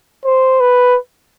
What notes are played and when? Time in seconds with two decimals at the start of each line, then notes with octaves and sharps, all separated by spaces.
0.25 C5
0.60 B4